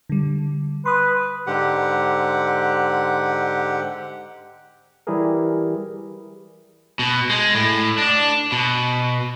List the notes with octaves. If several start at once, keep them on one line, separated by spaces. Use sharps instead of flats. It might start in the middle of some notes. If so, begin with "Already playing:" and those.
D3 G3
B4 C6 D#6
G#2 D3 G4 F#5
E3 G3 E4 G4 G#4 A#4
B2
G#3
A2
D4
B2